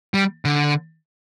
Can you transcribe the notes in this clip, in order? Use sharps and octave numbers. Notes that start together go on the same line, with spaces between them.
G3
D3